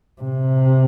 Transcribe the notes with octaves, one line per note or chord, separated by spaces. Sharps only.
C3